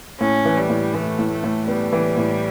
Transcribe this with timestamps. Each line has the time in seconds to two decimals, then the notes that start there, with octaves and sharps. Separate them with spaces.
0.20 A2 C#4
0.45 E3
0.57 G3
0.70 A2
0.94 E3 A3
1.19 A2
1.31 A3
1.44 A2
1.68 G3 B3
1.92 E3
2.17 A2